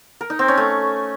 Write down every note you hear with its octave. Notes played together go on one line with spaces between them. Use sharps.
A#4
D#4
C4
C#4
A3